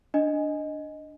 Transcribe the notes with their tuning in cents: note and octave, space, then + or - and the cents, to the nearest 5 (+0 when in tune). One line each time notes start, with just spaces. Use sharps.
D4 +0 D#5 +0 G#5 +5